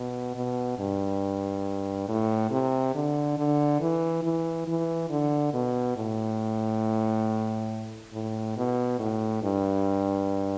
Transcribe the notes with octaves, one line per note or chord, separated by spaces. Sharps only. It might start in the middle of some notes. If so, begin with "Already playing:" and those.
Already playing: B2
B2
G2
A2
C3
D3
D3
E3
E3
E3
D3
B2
A2
A2
B2
A2
G2